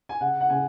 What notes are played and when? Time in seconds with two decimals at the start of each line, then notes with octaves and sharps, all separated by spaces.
0.09 G#5
0.21 C#3 F#5
0.41 F#5
0.50 C#3 G#5